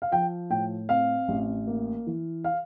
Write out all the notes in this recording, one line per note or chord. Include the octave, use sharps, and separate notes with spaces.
F5
F3 G5
A2 G5
C4 F5
A1
A#3
E3
F5